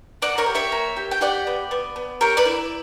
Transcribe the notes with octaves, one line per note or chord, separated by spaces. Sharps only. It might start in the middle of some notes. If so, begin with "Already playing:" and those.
A#3 D5 F#5
A#4 C#5
G4
C#5 E5
A#3
G4
G5
G4 D5 F#5
B3
B3
B3
G4 A#4 C#5
B4 D5
E4